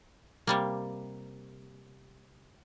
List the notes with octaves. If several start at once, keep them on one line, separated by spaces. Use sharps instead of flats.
C3 G3 A#3